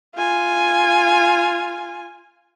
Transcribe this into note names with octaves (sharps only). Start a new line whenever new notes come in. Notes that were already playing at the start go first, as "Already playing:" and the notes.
F4 G#5